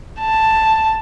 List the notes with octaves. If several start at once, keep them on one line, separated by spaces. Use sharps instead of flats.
A5